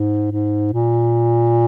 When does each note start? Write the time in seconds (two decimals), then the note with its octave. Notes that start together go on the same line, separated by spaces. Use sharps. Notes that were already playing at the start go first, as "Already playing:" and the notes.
Already playing: G#2
0.32 G#2
0.73 A#2